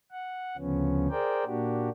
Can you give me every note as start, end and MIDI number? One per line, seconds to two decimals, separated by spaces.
0.11 0.56 78
0.57 1.08 38
0.57 1.08 49
0.57 1.08 53
0.57 1.08 59
0.57 1.08 61
1.10 1.44 68
1.10 1.44 70
1.10 1.44 72
1.10 1.44 74
1.10 1.44 79
1.46 1.89 46
1.46 1.89 58
1.46 1.89 62
1.46 1.89 66
1.46 1.89 67